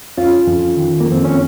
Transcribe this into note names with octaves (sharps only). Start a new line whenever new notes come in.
F2 C#4 F4
F2
D#3
A#3
F2
C4
C#4